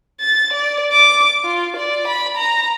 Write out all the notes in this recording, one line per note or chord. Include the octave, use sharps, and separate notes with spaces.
A6
D5
D6
F4
D5
B5
A#5